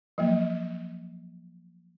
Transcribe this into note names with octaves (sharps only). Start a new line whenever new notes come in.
F3 F#3 A#3